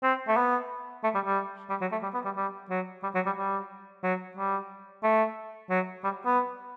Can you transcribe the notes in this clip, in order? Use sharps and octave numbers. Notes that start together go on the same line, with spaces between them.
C4
A3
B3
A3
G3
G3
G3
F#3
A3
G3
B3
G3
G3
F#3
G3
F#3
G3
G3
F#3
G3
A3
F#3
G3
B3